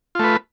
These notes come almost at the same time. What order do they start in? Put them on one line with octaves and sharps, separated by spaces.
F4 A3 B4